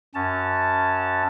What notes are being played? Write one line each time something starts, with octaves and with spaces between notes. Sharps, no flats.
F#2 C#4 A5